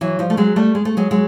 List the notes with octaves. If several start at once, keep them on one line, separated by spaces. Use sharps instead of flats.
E3 F#3
F3 G3
A3
F#3 G#3
G3 A3
G#3
A3
F#3 G#3
F#3 G#3